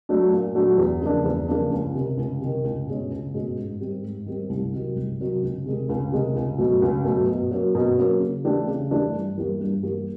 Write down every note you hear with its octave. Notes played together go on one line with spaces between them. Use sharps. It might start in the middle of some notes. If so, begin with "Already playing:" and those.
F#3 A3 D4 F#4
A#2
F#3 A3 D4 F#4
E2
C#3 F3 A#3 D4
E2
C#3 F3 A#3 D4
C#2
C3 D#3
C#2
C3 D#3
C#2
B2 G#3 C#4
C#2
B2 G#3 C#4
G#2
D#3 G3 C4
G#2
D#3 G3 C4
C2
C3 D#3 F#3
C2
C3 D#3 F#3
C#2
C3 D#3 G#3
C#2
C3 D#3 G#3
C#2
B2 F#3 A3
C#2
B2 F#3 A3
B2
F#3 A#3 C#4
B2
F#3 A#3 C#4
C#3
E3 A3 D4 G4
C#3
E3 A3 D4 G4
G2
E3 G3 A#3
G2
E3 G3 A#3